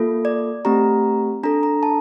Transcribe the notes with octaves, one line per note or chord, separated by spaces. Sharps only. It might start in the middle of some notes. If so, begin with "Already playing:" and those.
Already playing: A#3 F4 A4
D5
A3 C4 G4 A#5
D4 A4 A#5
A#5
A5